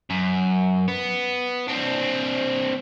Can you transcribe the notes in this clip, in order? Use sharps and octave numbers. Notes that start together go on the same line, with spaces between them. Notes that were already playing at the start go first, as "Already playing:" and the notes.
F#2
B3
C4 D4